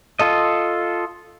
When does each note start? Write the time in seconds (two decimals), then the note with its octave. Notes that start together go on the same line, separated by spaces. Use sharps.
0.19 F4 A4 D#5